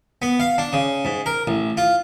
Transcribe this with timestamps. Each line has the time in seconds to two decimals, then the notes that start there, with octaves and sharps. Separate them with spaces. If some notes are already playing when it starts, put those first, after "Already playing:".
0.22 B3
0.40 F5
0.58 D4
0.73 C#3
1.05 G#2
1.26 A#4
1.47 A1
1.77 F4